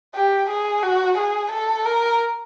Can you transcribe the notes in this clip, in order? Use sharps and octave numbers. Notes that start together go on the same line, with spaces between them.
G4
G#4
F#4
G#4
A4
A#4